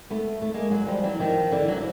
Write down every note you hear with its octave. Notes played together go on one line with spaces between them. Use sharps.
A3 B3
A3
G#3 A#3
F#3 G#3
F3 G3
E3 F#3
D#3 F3
D3 E3
F#3
F3